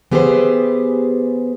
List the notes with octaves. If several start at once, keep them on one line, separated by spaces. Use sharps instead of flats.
E3 B3 G4 G#4 B4 C5